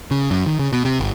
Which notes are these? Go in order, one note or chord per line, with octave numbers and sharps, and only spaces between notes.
C#3
F#2
D#3
C#3
B2
C3
G1